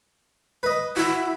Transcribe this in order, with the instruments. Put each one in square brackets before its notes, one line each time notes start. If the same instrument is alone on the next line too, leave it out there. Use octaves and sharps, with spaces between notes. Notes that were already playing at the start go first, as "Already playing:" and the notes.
[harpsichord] B4 D#5
[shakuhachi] E4 [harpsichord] F#4